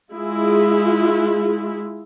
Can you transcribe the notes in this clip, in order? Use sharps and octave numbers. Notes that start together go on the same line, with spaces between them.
G#3 E4 F4 G#4